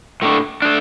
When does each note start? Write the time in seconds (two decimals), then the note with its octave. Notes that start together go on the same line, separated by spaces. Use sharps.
0.22 A2 A3 D4
0.62 A3 D4